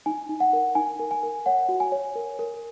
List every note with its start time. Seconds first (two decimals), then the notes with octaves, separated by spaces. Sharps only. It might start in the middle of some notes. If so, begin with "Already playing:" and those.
0.06 D#4 G#5
0.29 D#4
0.40 F#5
0.53 A#4
0.75 D#4 G#5
0.99 A#4
1.11 G#5
1.23 A#4
1.46 C#5 F#5
1.69 F#4
1.80 G#5
1.92 C#5
2.15 A#4
2.39 A#4